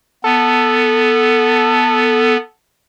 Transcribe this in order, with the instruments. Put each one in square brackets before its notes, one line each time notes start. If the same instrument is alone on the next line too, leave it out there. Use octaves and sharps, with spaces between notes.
[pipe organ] B3 [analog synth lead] A4